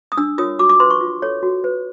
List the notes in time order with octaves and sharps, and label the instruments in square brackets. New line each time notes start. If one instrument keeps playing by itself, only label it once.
[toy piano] D#6
D4 E6
F4 A#4 C#5 D#6
F#4 D6
D6
B4 C6
C#6
F4
A4 C#5
F#4
B4